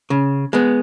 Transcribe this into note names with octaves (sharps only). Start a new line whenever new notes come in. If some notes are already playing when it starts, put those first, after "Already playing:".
C#3
G#3 B3